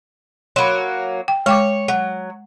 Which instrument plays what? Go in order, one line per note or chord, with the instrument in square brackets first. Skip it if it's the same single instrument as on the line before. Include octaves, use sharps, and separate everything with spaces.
[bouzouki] F#3 A#3 [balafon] B5 C6
[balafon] G5
[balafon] G#3 G5 D6 [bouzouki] C#5
[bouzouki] F#3 [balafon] F#5